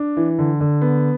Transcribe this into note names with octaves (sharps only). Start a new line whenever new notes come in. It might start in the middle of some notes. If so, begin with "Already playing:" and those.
Already playing: D4
E3
D3
D3
B3